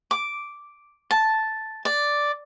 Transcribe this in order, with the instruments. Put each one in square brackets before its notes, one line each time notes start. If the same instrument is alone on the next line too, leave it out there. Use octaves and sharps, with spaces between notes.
[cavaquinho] D6
A5
D5